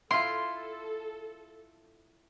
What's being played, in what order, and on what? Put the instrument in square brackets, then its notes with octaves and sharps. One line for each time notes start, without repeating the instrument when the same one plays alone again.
[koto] E4 F4 [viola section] A4 [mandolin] C6